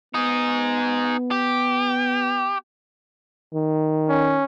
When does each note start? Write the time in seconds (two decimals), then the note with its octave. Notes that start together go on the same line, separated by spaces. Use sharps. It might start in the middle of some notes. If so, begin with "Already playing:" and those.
0.14 B3 D#4 G#4
1.31 G4
3.54 D#3
4.09 C#4